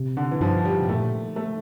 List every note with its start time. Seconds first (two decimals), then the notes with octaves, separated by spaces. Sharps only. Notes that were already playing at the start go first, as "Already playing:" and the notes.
Already playing: C3
0.17 D3
0.31 E3
0.41 G2 F3
0.65 G3
0.82 C3
0.89 A#2 A3
1.36 A3